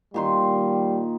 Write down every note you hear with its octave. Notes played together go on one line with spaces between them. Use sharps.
A#2 D#3 G3 C6